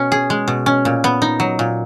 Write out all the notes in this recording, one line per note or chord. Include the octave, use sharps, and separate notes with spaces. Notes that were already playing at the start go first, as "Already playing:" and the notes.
Already playing: B2 C#4
G#4
G#3
B2
C#4
A#2
B3
D#4
F#3
A#2